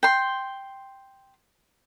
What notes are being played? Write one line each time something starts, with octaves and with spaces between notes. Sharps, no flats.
G5 C6